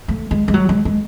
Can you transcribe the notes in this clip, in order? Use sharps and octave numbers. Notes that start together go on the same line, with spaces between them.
A3
G#3
G#3
F#3
G#3
G#3